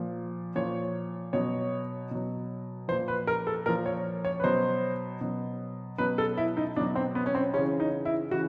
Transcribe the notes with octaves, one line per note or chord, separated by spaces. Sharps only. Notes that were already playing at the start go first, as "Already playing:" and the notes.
Already playing: A#2 F3
A#2 F3 C#5
B2 F#3 C#5
B2 F#3
A#2 F3 C5
B4
A#4
A4
A#2 F3 A#4
C#5
C#5
B4
B2 F#3 C5
B2 F#3
B2 F#3 B4
A4
E4
D#4
B2 F#3 D4
C4
B3
C#4
C4
C#3 E3 C#4
D#4
E4
C#3 E3 F#4